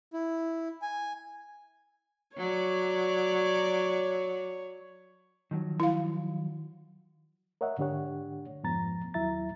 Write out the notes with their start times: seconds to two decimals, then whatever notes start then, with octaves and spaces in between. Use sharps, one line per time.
0.14 E4
0.82 G#5
2.37 F#3 C#5 D5
5.51 D#3 F3 F#3
5.80 E4 F5
7.61 A#4 C#5 D#5 E5 F#5
7.78 G#2 D3 D4 G4 C#5 F#5
8.63 F2 G#2 F3 B3 A#5 A6
9.14 D#2 F#3 E4 E5 A#5 A6